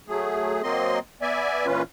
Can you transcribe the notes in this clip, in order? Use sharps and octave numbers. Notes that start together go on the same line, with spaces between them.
F#3 A3 G#4
F#3 A#3 C4 D#5 C6
B3 D5 E5 G#5
A#2 E3 C#4 F4 B4